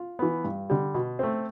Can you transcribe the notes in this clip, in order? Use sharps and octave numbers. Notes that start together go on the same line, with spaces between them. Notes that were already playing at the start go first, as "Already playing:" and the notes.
Already playing: F4
E3 B3
G2
D3 G3
B2
A3 C4